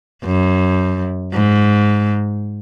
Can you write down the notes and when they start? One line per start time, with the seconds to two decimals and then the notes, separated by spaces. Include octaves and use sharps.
0.25 F#2
1.34 G#2